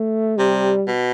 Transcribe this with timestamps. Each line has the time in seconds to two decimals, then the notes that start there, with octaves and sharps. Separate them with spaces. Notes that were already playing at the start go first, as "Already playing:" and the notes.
Already playing: A3
0.38 C3 G3
0.87 B2